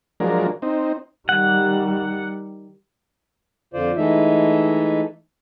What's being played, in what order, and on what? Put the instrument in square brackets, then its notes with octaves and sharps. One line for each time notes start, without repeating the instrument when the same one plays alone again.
[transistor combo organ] F3 F#3 G#3 D4 A#4
C4 D#4
[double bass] D#3 G3 [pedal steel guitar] F#5
[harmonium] F2 D3 F4 C5 D5
E3 G#3 A3 D#4 E5